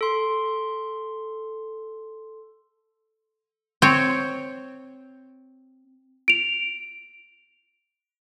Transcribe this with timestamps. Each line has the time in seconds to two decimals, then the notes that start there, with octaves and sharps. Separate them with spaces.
0.01 A4 C6
3.82 C4 C#5
6.28 D7 F7